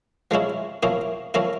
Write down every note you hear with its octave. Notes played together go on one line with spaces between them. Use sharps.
F3 G#3 C#4 E4
F3 A#3 C#4 E4
F3 A#3 C#4 E4